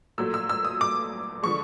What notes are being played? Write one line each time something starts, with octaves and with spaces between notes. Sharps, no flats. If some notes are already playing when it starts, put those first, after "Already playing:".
A#2 F#3 A3 E6
E6
E6
D#6
D6
D3 F3 G#3 C#6